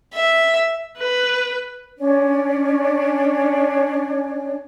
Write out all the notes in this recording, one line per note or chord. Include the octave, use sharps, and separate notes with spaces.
E5
B4
C#4 D4 C#5 D5